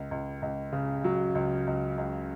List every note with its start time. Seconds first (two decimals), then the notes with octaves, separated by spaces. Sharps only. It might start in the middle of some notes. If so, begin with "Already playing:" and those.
Already playing: C#2
0.11 C#2
0.42 C#2
0.72 C#3
1.04 F#3
1.35 C#2
1.67 C#2
1.98 C#2